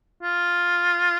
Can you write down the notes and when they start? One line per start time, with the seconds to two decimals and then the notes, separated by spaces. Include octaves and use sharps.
0.23 F4